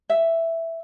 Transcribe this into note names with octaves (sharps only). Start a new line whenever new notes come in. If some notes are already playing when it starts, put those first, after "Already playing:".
E5